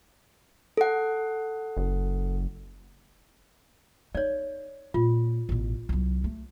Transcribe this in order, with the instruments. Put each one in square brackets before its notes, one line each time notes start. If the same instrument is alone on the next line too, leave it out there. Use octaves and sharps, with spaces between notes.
[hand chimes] A4 F#5
[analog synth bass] F#1
[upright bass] D#4 [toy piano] C#5 D5
[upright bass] A#2 [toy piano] F4
[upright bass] A1 B2
C2 F#3
A3